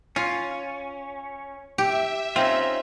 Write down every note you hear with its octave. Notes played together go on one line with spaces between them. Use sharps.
C#4 F4
G4 E5
C4 C#4 D#4 F4